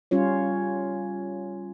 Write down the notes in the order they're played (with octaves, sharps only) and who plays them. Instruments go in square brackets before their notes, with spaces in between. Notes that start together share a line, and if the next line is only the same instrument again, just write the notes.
[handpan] G3 C#4 F4 C#5